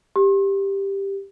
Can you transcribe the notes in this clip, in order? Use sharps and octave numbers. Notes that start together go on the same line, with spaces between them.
G4